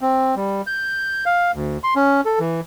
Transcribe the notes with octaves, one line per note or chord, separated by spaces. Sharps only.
C4
G3
G6
F5
D2
C6
C#4
A4
E3